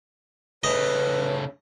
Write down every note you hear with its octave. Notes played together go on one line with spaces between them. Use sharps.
C#3 A3 B4 C#5 D#5